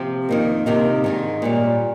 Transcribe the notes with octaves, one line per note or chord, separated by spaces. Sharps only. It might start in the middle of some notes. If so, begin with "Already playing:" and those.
Already playing: C3 F3 C4
F2 D#3 A#3
C3 D#3 A#3 D#4
G#2 D#3 G#3
A#2 G3 C#4